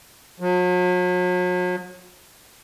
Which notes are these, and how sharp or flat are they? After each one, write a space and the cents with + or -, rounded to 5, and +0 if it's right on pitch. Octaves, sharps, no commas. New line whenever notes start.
F#3 -45